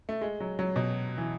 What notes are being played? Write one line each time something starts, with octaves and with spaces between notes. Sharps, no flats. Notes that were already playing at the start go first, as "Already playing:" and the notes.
A3
G#3
F#3
F#3
B2
E3